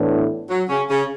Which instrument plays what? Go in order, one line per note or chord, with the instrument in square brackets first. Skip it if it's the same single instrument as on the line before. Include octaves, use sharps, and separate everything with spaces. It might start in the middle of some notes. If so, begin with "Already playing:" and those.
Already playing: [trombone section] A2 E3 B3 D4
[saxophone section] F#3
C#3 C#4
C#3 C#4